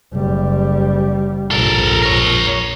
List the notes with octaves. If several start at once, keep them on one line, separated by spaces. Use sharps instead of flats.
F#1 G3
A#1 A#2 A4 A#4
A#4 C#5